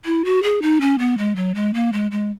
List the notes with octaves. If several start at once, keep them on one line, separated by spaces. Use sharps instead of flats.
E4
F#4
G#4
D#4
C#4
B3
G#3
F#3
G#3
A#3
G#3
G#3